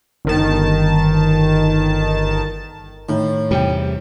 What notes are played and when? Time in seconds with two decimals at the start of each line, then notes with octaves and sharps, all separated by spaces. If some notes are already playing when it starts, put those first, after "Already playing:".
0.25 G1 D#3 A5
3.09 A2 D#3
3.51 E2 C3 G3 G5